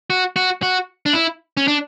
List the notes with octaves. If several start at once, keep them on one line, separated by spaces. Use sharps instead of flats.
F#4
F#4
F#4
D4
E4
C#4
D4